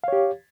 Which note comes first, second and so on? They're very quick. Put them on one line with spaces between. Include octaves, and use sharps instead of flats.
F5 C#5 G4